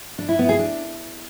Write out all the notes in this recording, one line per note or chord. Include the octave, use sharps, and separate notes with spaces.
D4
E4
B3
G#4
D4